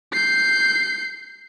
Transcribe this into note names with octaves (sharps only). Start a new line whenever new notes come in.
G6 C7